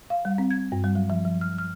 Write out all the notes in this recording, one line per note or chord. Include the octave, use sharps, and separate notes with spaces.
F5
G3
C4
G#6
G2
G3
F#3
F3
F3
F6
F6